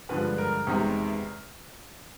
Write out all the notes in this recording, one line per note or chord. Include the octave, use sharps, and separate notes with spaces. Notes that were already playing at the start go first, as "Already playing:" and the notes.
G2 D3 F3 G#3 B4
A#4
E2 C3 D#3 G#3